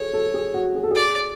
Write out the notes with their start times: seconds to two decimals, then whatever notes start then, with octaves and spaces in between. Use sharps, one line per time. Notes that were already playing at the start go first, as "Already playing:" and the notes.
Already playing: G#4 A4 C#5
0.14 A4
0.34 G#4
0.54 F#4
0.75 G#4
0.83 A4
0.91 G#4 D5